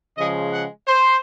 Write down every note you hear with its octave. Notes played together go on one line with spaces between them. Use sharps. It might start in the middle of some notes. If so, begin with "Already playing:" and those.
C#3 F3 G#3 D#5
F#5
C5